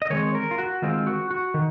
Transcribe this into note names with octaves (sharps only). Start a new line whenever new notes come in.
D#5
D#3 G#3 C4 C#5
A#4
F4
F#4
D#3 G#3 C4 F4
F#4
F#4
D#3